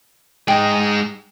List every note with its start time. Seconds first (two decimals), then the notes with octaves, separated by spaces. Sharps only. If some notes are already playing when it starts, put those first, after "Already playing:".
0.48 G#3 D#4 G5